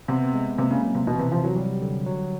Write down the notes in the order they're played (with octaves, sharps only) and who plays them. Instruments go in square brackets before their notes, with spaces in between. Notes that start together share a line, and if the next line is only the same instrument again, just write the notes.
[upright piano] C3 [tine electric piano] B3
[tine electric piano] G#3
[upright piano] C3 [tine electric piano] A#3
[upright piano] C#3
[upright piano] C#3 [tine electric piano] F#3
[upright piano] C3
[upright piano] B2 [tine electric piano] E3
[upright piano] C3
[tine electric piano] C3 [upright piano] F3
[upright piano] F#3
[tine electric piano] F#3 [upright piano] G3
[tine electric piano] D3
F#3